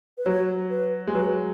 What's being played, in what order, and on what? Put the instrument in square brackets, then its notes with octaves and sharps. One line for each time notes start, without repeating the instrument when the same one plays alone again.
[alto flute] B4
[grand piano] F#3 [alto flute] C#5
[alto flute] B4
[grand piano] G#3
[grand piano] F#3 [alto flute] B4